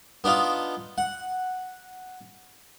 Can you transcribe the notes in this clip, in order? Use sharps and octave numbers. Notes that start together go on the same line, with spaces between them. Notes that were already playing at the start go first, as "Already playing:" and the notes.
B3 D4 D#4 F4
F#5